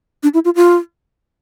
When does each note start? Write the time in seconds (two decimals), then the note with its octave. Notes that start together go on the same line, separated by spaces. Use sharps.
0.23 D4
0.34 E4
0.45 F4
0.56 F4